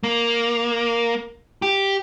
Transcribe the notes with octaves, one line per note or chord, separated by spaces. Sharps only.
A#3
G4